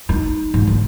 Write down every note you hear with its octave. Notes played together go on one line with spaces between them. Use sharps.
D#4
G#2
D2